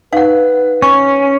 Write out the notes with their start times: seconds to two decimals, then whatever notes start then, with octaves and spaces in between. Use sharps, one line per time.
0.13 D#4 B4 F5 F#5
0.82 C#4 C#6